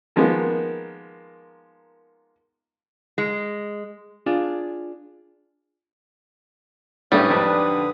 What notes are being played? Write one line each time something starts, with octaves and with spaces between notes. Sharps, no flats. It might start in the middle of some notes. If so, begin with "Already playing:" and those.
D#3 F3 G#3 A#3 B3
G#3
D4 F4 G#4
A2 D3 G3 A3 C#4 B4 D#6
F2 G#2 D4